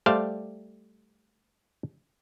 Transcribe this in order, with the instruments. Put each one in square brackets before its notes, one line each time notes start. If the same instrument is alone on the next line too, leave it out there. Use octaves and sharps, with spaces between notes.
[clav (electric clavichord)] G3 A3 C5 D5 F5